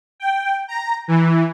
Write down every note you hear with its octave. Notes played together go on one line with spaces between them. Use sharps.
G5
A#5
E3